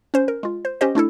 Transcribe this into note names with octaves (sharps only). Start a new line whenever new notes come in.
C#4 C5
A#4
G#3 F4
C5
C#4 G4 C5 D#5
A3 D4 E4 A4